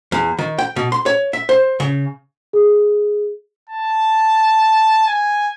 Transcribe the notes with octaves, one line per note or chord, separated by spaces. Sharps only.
E2
D#3
G5
B2
C6
C#5
E5
C5
C#3
G#4
A5
G#5